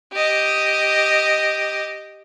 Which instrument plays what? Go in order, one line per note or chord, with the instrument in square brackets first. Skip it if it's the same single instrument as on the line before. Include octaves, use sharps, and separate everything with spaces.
[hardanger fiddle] G4 D#5